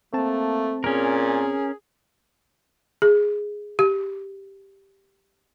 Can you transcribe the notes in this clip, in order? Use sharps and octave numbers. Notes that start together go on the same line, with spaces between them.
A3 A#3 C4 A5
A#2 C#4 G#4 A#4
G#4
G4